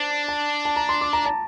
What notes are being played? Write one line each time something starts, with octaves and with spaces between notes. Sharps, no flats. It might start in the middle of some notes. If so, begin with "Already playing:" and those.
Already playing: D4 C5 A5
A5
A5
A#5
C6
D6
A#5
A5